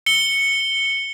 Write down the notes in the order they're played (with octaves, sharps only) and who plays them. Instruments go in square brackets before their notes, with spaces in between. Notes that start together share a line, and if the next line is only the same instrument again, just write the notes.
[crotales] C#7 G7